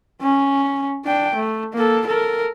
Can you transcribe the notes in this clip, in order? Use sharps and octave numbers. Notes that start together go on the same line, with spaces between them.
C#4
D4 G5
A3
A#3 A4
A4 A#4